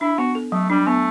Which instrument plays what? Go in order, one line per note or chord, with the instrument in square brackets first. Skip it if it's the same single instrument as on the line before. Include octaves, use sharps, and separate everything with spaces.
[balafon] D4 [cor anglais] E4
[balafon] B3 [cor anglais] F#4
[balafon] A4
[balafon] F#3 [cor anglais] A3
[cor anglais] G3 [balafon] D4
[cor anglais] A3 [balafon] B3